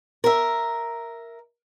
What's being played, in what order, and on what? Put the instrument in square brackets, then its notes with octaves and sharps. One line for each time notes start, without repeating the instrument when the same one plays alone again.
[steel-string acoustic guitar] A#4 E5